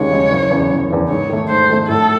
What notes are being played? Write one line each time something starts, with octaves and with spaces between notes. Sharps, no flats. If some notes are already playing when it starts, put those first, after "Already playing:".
Already playing: D#2 C#3 G#3 C#5
C#3 G#3
F#1
E2 C#3
F#1
E2 C#3
G#2 C#5
D#3 A3
G#2 C5
D#3 A3
A2 A4